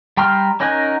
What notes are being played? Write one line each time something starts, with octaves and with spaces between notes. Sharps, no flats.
G3 G5 A#5 C6 F6
C#4 D#4 A#4 F#5 G#5